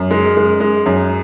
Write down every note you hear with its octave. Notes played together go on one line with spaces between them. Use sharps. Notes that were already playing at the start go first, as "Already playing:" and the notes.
Already playing: F#2
G#3
G#3
G#3
F#2